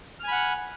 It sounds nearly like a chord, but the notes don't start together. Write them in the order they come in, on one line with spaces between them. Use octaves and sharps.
F6 G#5 B5 F#5